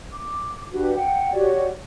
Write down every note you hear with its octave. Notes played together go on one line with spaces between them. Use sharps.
D6
D4 F#4 G4 B4
F#5 G5
F#4 G4 C#5 D5